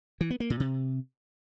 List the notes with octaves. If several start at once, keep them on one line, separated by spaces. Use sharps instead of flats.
E3
B3
A#3
A#2
C3